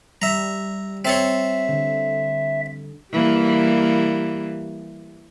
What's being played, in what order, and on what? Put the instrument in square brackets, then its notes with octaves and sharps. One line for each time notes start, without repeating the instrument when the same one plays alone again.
[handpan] G3 [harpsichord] E5 A#5
[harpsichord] C4 A4 C#5 [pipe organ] E5
[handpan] D3
[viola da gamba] E3 G3 A#3